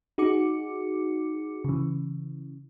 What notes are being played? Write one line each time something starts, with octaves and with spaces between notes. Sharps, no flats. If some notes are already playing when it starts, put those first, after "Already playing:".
D#4 F#4 G#4 D6 C#7
C#3 E3